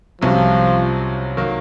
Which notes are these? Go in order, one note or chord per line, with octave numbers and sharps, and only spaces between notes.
C2 C3 F3 F#3 C#4
D#3 F#3 A#3